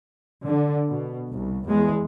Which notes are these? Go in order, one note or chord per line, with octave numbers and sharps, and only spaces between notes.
D3
B2
C2
E2 G#3